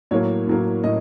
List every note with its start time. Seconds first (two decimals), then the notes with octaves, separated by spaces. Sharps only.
0.11 A2 F#3 A#3 C#5
0.47 A2 F#3 A#3
0.84 A2 D#5